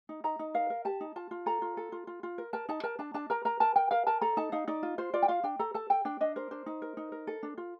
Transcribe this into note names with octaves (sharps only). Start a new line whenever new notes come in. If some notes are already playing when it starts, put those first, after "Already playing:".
D#4
D#4 A#5
D#4
A#4 F5
A#4
G4 A5
D#4
F4 A5
F4
A4 A#5
F4
A4
F4
F4
F4
A#4
A#4 A5
D#4 A5
A#4 A5
D4 A5
D4 A5
A#4 A#5
A#4 A#5
A#4 A5
A#4 G5
A#4 F5
A#4 A5
A4 A#5
D#4 A5
D#4 F5
D#4 D5
F4
F4 C5
F4 D5
G5
F4 F5
D4 G5
A4 A#5
A4 A5
A4 G5
D4 G5
D4 D#5
A#4 C5
D4 C5
D#4
A#4
D#4
A#4
A4
D4
F4